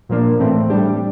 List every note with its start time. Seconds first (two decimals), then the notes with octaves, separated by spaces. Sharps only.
0.09 A#2 F3 A#3 D4
0.40 A2 E3 A3 C4
0.70 A2 G3 D4 G4